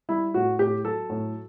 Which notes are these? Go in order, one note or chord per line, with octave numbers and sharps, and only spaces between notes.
G3 E4
A2 F#4
A2 G4
F#3 A4
A2